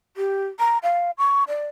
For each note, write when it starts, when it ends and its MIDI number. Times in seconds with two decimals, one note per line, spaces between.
0.17 0.46 67
0.59 0.78 82
0.83 1.11 77
1.18 1.43 85
1.48 1.68 74